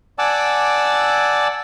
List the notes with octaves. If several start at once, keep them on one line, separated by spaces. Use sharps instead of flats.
D5 F#5 G#5 A5 D6 E6